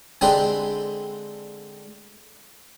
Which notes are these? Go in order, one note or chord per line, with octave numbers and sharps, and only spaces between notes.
D3 G#3 C4 D4 G4 B4